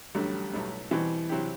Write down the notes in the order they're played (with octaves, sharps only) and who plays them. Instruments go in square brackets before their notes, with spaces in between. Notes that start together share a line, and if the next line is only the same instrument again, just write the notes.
[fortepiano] A1 G2 D3 F#3 A3 [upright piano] G3
[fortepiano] B1 A2 F#3 A3
[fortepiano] B2 G3 C4 [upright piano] E3
[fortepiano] C3 F#3 C4 E4 G4